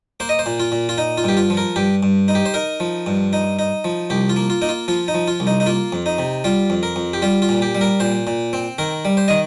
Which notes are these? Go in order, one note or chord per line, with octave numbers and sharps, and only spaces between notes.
A#3 C5
D#5
C5
A#2
F4
A#2
F4
D#4
F4
G2 G4
F4
F3
A#4
G2 G4
G2
D#4
G4
C5
D#4 A#4
F3
G2
D#4
D#4
F3
C2 G4
F4
A#3
F4
A#3 D#4
F4
F3 F4
D#4
F3
F4
C2
D#4
D#4
A#3 F4
F2
D#4
C3
G3 F4
F2
A#4
F2
G4
G3 F4
F4
A#2
G4
G3
A#4
A#2 C5
A#2
C4
D#3 A#4
G3
C5
D#3 D#5